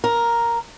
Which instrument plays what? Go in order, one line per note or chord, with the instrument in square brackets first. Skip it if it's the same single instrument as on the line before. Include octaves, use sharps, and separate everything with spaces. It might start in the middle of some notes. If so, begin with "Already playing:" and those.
[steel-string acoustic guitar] A#4